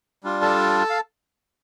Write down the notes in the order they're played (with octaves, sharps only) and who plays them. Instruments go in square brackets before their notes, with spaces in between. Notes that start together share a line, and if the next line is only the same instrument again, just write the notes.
[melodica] G3 D4 F4
A4 A5
F5